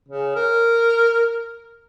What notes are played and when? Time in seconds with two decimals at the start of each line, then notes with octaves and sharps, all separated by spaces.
0.08 C#3
0.36 A#4